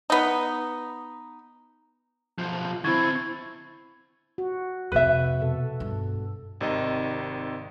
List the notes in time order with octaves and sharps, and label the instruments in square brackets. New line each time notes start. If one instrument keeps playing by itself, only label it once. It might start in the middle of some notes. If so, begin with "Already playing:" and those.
[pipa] B3 D#4
[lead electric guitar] B1 F3
[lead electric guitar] D3 C4 [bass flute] E4 [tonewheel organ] A5 C#6 G#6
[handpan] F#4
[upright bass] F2 C3 [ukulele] B4 E5
[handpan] B2 A4
[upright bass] G2
[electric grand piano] G#1 C3 D#3 D#5